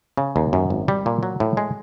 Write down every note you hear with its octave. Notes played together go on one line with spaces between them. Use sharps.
C#3
D#2
F#2
G#1
G3
A#2
F#3
A2
G#3